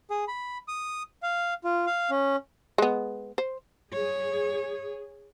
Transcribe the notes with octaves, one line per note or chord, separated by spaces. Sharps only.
G#4
B5
D#6
F5
F4
F5
C#4
G#3 B3
C5
G#4 C#5